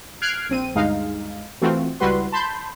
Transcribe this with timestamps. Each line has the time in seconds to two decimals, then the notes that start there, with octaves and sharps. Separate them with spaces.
0.22 F6 F#6 G#6 C7 D7
0.49 A#1 C4 D#7
0.75 D2 G2 G#3 D#4 F5
1.61 E3 A3 C4 F4 F#4
2.00 C#2 G3 E4 F#4 B4 C6
2.32 A5 B5 C6 G6